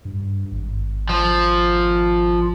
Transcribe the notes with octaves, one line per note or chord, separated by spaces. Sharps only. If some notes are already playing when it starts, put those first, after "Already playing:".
G2
G#1
F3